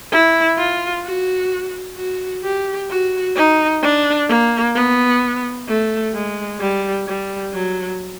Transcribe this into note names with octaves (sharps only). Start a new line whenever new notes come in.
E4
F4
F#4
F#4
G4
F#4
D#4
D4
A#3
B3
A3
G#3
G3
G3
F#3